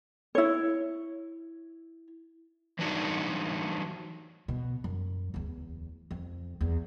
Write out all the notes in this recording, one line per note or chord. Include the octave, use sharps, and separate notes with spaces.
E4 C#5
E3 F#3 G3 D4 D#4 F#4
B2
F#2
D1 E2
F2
E2